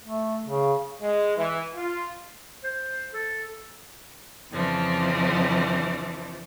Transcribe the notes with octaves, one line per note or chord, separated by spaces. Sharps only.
A3
C#3
G#3
E3
F4
C5
A4
F2 C#3 E3 F3 D4